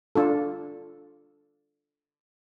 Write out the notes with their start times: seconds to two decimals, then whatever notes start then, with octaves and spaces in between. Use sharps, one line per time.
0.15 D4 F4 A4